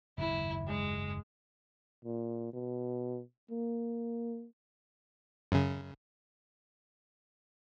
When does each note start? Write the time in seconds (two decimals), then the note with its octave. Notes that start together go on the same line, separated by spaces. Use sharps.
0.18 F#1 D#2 G#2 E4
0.67 G#3
2.05 A#2
2.53 B2
3.51 A#3
5.52 F#2 C#3